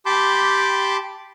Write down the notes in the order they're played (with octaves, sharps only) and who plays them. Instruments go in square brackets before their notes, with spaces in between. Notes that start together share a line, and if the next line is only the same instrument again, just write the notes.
[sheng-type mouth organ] G4 A5 B5 C6 D6 G6